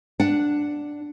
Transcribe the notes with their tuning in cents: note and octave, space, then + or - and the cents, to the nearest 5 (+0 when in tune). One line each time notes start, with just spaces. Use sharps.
D4 +0 F#5 +0